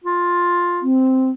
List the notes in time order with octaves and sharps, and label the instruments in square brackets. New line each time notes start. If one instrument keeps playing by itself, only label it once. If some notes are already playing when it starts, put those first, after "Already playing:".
[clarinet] F4
[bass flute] C4